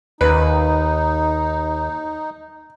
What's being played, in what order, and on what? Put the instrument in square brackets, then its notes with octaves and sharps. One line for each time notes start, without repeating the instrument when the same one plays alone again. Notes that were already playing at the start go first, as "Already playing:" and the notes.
[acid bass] D#2 [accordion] D#4 [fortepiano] B4